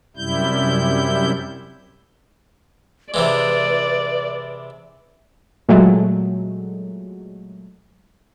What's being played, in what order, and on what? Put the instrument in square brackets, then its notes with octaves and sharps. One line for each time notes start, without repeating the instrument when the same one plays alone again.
[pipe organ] F#2 C3 G3 E4 G6
[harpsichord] C3 E3 G#3 [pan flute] B4 [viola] D5
[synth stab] A#2 F#3 G#3 A3